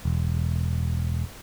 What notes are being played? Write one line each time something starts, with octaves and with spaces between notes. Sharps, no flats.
E1